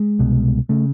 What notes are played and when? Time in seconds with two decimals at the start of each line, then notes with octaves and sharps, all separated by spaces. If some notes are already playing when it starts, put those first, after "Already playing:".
Already playing: G#3
0.19 C2 B2
0.69 C#3 A3